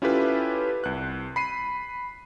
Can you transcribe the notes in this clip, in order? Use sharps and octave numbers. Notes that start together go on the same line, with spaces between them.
C#4 E4 F4 G4 A4 B4
C2 F#6
B5 C7 D#7